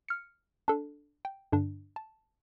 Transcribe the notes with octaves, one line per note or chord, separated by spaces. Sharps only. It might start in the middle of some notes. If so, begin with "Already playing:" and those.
F6 C#7
D4 A4
G5
G2 D3 D4
A5